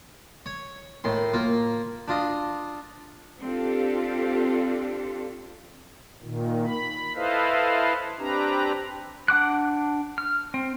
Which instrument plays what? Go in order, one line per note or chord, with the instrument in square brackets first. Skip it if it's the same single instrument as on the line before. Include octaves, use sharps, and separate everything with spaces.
[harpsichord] C#5
A2 D#3 C6
A#3 F4
D4 F4 D#5
[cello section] C4 D4 F4 G4 A4
[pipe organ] A#2 D#3
B5
E4 A4 B4 C5 D#5 F5
C4 D4 G4 B4 A#5
[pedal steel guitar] D4 F#5 D6 F#6
F6
C4